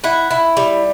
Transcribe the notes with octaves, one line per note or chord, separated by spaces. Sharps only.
E4 F#5
E4
G3